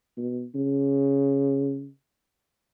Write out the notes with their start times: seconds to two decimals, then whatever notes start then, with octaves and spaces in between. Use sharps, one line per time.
0.17 B2
0.55 C#3